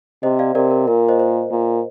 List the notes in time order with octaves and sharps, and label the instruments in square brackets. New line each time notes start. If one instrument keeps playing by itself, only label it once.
[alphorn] C3 [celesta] C5 D#5
[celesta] D5 F5
[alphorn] C3 [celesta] A#4 D5
[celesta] A#4
[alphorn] A#2 [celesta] A#4
[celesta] C5 D#5
C5
[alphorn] A#2